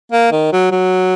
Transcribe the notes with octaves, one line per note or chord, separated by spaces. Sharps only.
A#3
D#3
F#3
F#3